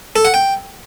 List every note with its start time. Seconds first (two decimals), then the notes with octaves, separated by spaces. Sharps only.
0.16 A4
0.25 F#5
0.34 G5